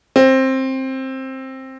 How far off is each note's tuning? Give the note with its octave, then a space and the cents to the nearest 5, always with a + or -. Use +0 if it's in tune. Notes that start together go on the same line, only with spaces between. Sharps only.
C4 +15